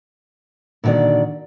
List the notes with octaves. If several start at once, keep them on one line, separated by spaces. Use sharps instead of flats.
A#2 D3 D#3 F#4 D5